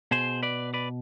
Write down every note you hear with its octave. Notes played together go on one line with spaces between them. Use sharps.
B2 G#4 C5
B4 D5
B4 D5